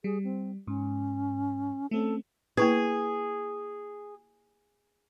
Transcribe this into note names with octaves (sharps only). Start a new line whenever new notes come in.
G3 G#4
C4
G#2 C#4
A3 C4 C#4 A4
A#3 E4 G#4 B4